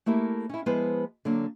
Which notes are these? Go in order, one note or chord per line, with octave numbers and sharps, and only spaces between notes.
A3 A#3 E4 G4 A#4
C#4 E4
F3 G#3 B3 E4 B4 C5
D3 F#3 A#3